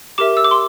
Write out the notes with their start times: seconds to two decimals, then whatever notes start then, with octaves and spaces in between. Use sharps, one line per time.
0.18 G4 A#4 E5 D6
0.37 E6
0.44 D6
0.51 C6